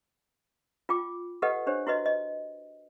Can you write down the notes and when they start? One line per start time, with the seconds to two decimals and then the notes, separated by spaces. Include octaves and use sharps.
0.89 F4 G5 D6
1.42 G4 A4 B4 D#5 F#5
1.67 D4 G4 C5 C#5
1.87 E4 F#4 B4 D#5
2.06 D#5